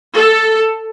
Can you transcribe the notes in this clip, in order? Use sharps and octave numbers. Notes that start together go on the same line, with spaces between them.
A4